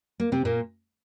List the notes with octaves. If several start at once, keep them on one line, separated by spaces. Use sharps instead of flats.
A#3
C3 C4
A#2 A#3